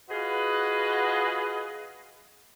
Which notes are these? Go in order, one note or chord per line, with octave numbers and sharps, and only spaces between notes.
F4 F#4 G#4 B4 D#5